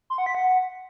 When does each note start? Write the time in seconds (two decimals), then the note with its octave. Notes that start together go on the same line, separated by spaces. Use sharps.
0.10 C6
0.18 F#5
0.26 B6
0.35 F#5